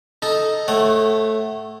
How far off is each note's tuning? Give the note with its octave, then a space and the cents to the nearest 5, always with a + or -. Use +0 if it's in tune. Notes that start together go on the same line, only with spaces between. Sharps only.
D#4 +0 A4 -5
A3 +0 C#5 -35 F#5 +30